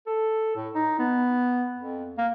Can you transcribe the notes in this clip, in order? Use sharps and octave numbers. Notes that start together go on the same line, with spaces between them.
A4
A2
D#4
B3
F2
A#3